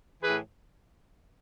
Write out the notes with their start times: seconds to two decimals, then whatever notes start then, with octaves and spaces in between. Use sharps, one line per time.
0.23 A2 E3 G#4 B4